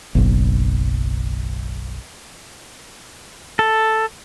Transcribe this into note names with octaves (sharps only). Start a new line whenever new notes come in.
F#1 B1
A4